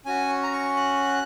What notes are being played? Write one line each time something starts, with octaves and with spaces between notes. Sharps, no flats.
C#4 F#4 G#5
A#5
C#6
F#6